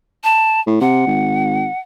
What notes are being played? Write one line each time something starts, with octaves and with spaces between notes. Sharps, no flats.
A5
A2
C3 F#5
G#1